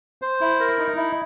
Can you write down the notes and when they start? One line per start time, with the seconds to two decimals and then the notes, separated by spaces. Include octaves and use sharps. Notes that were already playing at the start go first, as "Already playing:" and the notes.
0.22 C5
0.41 E4
0.60 A#4
0.79 D#4
0.97 E4